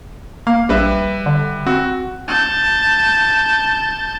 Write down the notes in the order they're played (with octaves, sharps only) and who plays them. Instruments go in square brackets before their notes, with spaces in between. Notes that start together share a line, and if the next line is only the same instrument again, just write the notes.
[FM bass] A#3 [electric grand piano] F5
[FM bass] A#1 [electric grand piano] G3 B4 E5
[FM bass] D3
[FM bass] C4 [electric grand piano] F#4
[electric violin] A5 G6